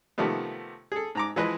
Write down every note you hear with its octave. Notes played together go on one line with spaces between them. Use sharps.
C3 D#3 F3 A3 B3
G#4 A4
G#2 A#5 D6
E3 F3 G#3 B4 D#5